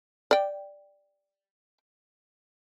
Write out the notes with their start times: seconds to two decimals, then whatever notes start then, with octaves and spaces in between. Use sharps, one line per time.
0.31 D5 G5